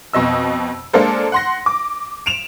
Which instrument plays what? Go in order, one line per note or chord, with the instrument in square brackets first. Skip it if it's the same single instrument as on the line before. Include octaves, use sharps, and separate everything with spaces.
[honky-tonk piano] F2 B2 D#5 E6
G#3 A#3 D4 A4 C5
F#5 C6 A#6
D6
D7 E7 F7